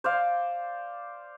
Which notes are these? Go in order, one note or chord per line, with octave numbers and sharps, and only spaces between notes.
C5 D5 F5